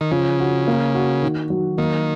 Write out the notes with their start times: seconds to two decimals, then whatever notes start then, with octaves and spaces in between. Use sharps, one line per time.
0.01 D#3
0.11 C#3 F3
0.40 F#4
0.67 A#3
0.95 F#4
1.22 D#3
1.50 F#3
1.78 D#3 A#3